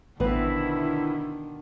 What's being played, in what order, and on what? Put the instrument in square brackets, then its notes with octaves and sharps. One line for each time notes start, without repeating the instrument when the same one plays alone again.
[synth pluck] A1 B3 [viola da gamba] B2 D3 D#3 [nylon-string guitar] C4 B4 [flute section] E4